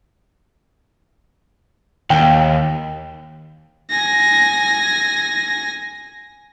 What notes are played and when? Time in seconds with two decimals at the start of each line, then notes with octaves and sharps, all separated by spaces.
2.10 D#2 G5
3.90 G#5 A#6